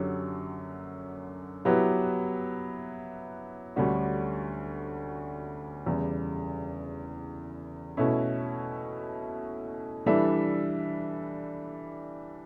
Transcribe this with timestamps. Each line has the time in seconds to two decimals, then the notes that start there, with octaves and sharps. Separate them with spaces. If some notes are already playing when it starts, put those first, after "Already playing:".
Already playing: F#2 D3 F#3 C#4 G4
1.65 F#3 B3 E4 G4 B4
3.76 D2 D3 G3 C#4 F#4
5.86 E2 C#3 G3
7.97 B2 A3 C#4 E4
10.06 E3 G3 D4 A4 E5